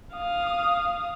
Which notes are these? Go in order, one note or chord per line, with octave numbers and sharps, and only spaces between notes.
F5 D#6